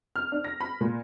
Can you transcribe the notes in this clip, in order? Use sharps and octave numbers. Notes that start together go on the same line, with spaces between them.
F6
D4
A#6
B5
A#2